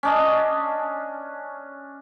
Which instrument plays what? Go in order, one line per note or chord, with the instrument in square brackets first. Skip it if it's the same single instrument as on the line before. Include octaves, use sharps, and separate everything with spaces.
[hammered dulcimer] C#4 D4 D#5